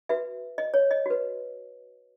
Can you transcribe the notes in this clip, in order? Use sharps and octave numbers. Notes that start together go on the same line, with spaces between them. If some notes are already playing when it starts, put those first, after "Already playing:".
F#4 B4 E5
D#5
C#5
D#5
F#4 B4